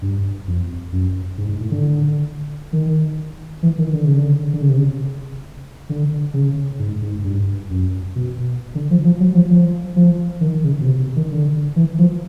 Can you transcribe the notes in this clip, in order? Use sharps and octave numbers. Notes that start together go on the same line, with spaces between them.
G2
F2
F#2
G#2
G#2
A2
D3
D#3
E3
D#3
D3
C#3
D3
D3
C#3
C3
C#3
D3
C#3
G#2
G#2
G2
F#2
B2
D3
F3
F3
F#3
F3
F3
F3
D#3
C#3
B2
C3
D#3
D3
E3
F3